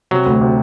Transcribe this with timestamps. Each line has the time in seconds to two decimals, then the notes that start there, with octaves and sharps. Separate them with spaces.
0.11 C3 F#3
0.26 D2
0.41 C3